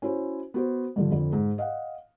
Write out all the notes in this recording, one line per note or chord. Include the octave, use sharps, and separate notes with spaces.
C#4 E4 F#4 C5
B3 F#4 C5
G2 D3 F3
F2 D3
G#2
D#5 F5 F#5